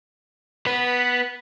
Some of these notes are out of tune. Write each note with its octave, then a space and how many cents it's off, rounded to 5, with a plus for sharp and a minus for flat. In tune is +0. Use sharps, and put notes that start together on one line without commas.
B3 +0 B4 -10